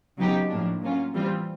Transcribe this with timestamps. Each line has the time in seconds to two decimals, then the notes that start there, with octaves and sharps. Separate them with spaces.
0.18 C#3 F#3 B3 D#4 G4
0.49 A2 F3 A#3 D4
0.81 F#3 A#3 C#4 F4
1.13 E3 G3 C4 F4